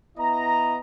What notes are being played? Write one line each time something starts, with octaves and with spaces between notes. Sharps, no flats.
B3 E4 D#5 A#5